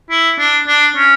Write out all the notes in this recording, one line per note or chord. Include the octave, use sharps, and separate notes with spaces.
E4
D4
D4
C#4